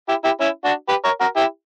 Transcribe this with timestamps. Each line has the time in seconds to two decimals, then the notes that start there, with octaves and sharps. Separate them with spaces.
0.09 E4 G4
0.24 E4 G4
0.40 C#4 E4
0.65 D4 F#4
0.89 G4 B4
1.04 A#4 C#5
1.21 F#4 A#4
1.36 E4 G4